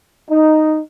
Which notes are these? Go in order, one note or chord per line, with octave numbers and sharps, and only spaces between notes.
D#4